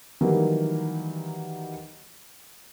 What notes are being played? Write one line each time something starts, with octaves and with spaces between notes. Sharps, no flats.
D#3 E3 F#3 G3 A#3